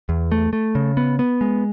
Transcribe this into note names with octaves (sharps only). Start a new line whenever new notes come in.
E2
A3
A3
C#3
B3
B3
G#3